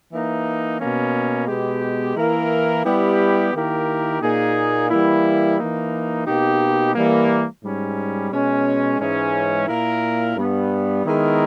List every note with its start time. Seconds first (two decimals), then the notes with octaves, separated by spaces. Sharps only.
0.10 E3 A#3 D#4
0.79 B2 A#3 C#4
1.47 B2 G#3 B3 G4
2.16 E3 A#3 E4 A#4
2.85 G3 B3 E4 G4
3.53 D#3 A#3 E4 G4 A#4
4.22 A#2 A#3 D#4 G#4
4.90 E3 G3 A#3 E4
5.58 E3 A#3 D#4
6.26 B2 A#3 D#4 G4
6.95 E3 G3 A#3
7.62 G#2 G3 C#4
8.32 B2 G#3 C#4
8.99 G#2 E3 G#3 C#4
9.68 A#2 A#3 E4 A#4
10.36 G2 G3 B3
11.05 D#3 G#3 B3 E4 A#4